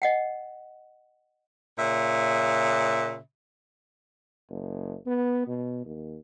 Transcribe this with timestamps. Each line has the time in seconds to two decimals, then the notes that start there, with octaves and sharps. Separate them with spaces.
0.02 D#5 F#5 G5
1.79 A#2 C#3 E5
4.50 F#1
5.06 B3
5.47 B2
5.85 D#2